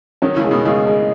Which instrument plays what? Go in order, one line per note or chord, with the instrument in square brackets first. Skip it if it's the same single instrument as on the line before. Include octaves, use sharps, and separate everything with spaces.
[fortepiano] D#3 F#3 [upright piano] C#4
[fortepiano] C#3 E3
[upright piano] G#3
[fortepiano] B2 D#3
[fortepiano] C#3 E3 [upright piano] G#3
[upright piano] G#3